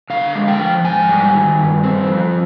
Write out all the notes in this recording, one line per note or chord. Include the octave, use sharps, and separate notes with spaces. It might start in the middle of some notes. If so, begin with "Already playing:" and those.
D3 F5
G#3
G5
F3
G#2 G#5
G3
D#3
G2
C4
F3